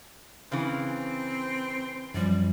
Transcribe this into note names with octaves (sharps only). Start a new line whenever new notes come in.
C#3 E3 C4
F#2 F3 G3